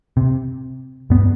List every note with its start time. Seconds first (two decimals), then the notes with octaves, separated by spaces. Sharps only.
0.17 C3
1.10 G2 B3